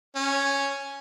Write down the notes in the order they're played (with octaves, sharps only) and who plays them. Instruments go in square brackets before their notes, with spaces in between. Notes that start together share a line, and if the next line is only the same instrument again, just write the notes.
[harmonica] C#4